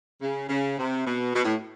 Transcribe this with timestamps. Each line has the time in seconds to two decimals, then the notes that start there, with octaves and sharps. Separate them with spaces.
0.21 C#3
0.49 C#3
0.78 C3
1.05 B2
1.34 B2
1.44 A2